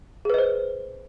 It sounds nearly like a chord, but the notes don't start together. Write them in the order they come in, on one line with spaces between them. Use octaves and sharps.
G#4 B4 D#5 C5